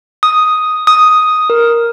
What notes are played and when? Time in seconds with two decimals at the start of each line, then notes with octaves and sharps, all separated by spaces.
0.23 D#6
0.87 D#6
1.50 A#4